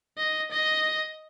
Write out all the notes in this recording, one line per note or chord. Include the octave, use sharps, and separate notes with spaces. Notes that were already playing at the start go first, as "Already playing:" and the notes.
D#5
D#5